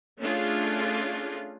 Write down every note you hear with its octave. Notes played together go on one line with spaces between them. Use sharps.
A3 C#4 D4 F4 G#4